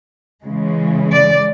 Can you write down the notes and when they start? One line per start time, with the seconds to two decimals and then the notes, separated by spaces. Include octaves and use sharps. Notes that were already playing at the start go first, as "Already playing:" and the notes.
0.43 C#3 E3 G#3
1.13 D5